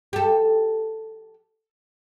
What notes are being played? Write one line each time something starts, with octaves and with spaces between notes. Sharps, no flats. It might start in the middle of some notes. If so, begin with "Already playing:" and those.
G4 A4